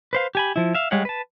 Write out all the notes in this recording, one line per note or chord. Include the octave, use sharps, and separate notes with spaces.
B4 C5 F5
G4 G#5 B5
F3 E4
E5 F5
G3 G#3 C#5 F5 F#5
B4 A5